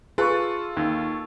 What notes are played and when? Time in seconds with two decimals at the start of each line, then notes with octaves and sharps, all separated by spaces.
0.18 F4 G#4 A4 B4 C#6
0.77 D#2